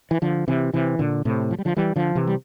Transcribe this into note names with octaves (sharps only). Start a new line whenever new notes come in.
E3
D3 F3
C3 E3
C3 E3
A#2 D3
A2 C3
F3
G3
D3 F3
E3 G3
D3 F3
C3 E3
G3